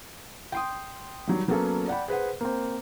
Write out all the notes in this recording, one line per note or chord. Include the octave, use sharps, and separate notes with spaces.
G5 C6 D#6
D#3 F#3 G3
F#3 A#3 B3 C#4 A4
D5 F#5 G5 B5
G#4 B4 C5 F#5
A#3 C4